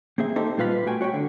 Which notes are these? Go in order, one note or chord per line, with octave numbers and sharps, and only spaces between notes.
A#3 C4 G#4 E5
A#3 C4 D#4 G4 A4 C5
A#2 G3 F4 B4 F5 B5
A3 F#4 G5 G#5
F#4 C#5 E5 G5
D3